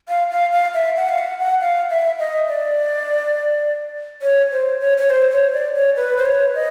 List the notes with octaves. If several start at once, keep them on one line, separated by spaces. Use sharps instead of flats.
F5
F5
F5
E5
F#5
F5
F#5
F#5
F5
E5
D#5
D5
C#5
C5
C#5
C#5
C5
C#5
D5
C#5
B4
C5
C#5
D#5